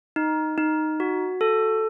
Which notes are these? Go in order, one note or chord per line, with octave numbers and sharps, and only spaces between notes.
D#4
D#4
F#4
A4